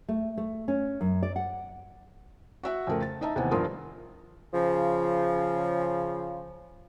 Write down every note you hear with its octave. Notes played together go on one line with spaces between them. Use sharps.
A3
A3
C#4
F#2
D5
F#5
F#4 E5 F#5
F2 C#3 A3 A#4
A6
D#4 D#5 E5 A5 A#5
D#2 C3 E3 B3 F#5 G#5
G2 F3 F4 A#4 C6 D#6
C#3 F3